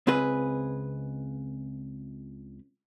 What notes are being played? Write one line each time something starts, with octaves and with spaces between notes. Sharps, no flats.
C#2 C4 G#4 B4